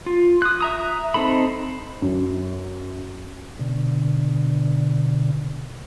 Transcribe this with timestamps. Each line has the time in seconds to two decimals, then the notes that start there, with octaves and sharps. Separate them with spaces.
0.06 F4
0.42 D#6 F#6
0.61 E5 A#5 D#6
1.14 C4 D#4 A4 B5
2.02 F#2
3.59 B2 D3